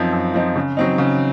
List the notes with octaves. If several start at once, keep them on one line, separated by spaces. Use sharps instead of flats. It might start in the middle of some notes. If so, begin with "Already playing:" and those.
Already playing: F#2 F3 C4 D#4
F#2
F3 C4 D#4
C#3
F#3 C4 D#4
C#3